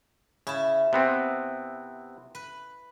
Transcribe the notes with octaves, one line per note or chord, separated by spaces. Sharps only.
C#3 E4 A5
C3 B3 C4
B4